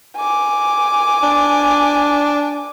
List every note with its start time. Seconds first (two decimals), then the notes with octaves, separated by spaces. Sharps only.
0.16 G#5 D6
1.23 D4